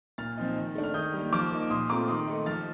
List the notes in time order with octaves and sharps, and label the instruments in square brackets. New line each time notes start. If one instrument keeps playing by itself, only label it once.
[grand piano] A#2 F6 A6
F3 C4 D#4
D#3
A3 D4
F6
D#3 D#6 G6
G3 A#3
F3 D6 F6
A#3 D#4
A#2 C6 D#6
A3 C4 F4 A#5 D6
D#3 C6 D#6
A3 D#4
F3 F6 A6